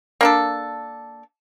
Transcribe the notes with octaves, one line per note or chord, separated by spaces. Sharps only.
A#3 D4 A4